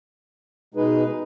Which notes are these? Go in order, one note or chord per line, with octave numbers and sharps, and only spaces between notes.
B2 G#3 D#4 G#4 B4